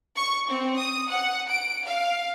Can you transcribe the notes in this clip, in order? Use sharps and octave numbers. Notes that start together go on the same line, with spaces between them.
C#6
C4
D#6
F#5
D7
F5